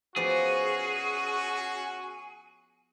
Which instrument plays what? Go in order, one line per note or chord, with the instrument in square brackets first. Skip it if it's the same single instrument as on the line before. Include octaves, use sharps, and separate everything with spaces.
[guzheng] F3 B3 D5 [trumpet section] C#4 F#4 [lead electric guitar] G#4